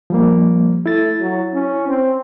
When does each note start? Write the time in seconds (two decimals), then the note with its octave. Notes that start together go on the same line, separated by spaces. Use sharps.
0.10 F3 G3 A#3
0.86 A3 E4 A6
1.20 F#3
1.53 C#4
1.88 C4